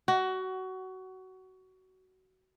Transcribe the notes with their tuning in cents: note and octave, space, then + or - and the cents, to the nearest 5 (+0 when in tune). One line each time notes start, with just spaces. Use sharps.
F#4 +20